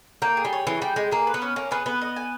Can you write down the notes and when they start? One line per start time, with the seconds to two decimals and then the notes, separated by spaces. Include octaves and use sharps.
0.22 A#3 G5
0.37 G#4
0.45 G3
0.53 C#5
0.67 E3 G#4
0.82 G3 G5
0.96 G#3 G#4
1.11 A#3 G#4
1.27 B4
1.34 B3
1.42 C#4
1.56 A#3 C#4
1.71 B3 G#4
1.86 B3 B4
2.01 D#5
2.16 G#5